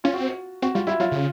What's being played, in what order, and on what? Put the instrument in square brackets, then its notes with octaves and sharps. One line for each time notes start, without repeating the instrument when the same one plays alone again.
[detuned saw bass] C#4 [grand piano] F4
[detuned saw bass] C4 [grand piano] F#4
[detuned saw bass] C4 [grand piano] F#4
[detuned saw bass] G3 [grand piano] F4
[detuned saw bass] G3 [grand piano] E4
[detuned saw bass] F#3 [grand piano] F4
[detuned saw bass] C#3